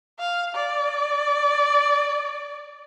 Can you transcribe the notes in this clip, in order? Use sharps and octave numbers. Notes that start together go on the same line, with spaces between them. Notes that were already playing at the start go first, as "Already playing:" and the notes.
F5
D5